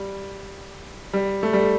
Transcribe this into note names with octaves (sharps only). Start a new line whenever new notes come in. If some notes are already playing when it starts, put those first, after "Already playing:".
Already playing: G3
G3
A3
G3